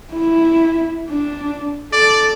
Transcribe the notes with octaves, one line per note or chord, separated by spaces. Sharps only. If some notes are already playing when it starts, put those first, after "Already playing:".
E4
D4
A4 D5